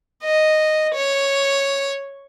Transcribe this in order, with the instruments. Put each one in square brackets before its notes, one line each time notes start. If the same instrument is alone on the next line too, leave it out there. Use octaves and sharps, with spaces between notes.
[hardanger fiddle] D#5
C#5